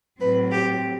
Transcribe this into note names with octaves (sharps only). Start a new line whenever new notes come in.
A2 F#3 C4 B4
G4